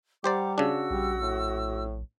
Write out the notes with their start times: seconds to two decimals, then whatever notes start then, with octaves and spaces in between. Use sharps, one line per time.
0.24 G3 G4 C5 D5 F#5 A#5 D6
0.58 C#3 D4 F#4 E6
0.91 A#1 G3
1.21 A2